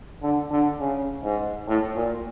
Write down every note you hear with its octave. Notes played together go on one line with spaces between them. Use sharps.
D3
D3
C#3
G#2
A2
A#2